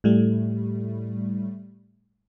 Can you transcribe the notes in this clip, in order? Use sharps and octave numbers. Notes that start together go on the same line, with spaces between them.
A2 G3 A3